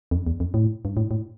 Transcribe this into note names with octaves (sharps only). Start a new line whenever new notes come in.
F2
E2
F2
A2
G2
A2
A2